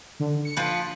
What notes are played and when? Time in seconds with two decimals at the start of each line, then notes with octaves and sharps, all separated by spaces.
0.20 D3
0.45 C#7
0.57 F3 F4 B4